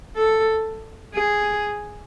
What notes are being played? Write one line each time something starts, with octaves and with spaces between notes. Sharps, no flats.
A4
G#4